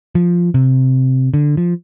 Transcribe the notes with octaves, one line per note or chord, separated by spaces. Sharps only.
F3
C3
D3
F3